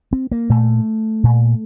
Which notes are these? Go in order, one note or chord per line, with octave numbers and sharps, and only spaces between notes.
C4
A#3
A#2 A3
A#2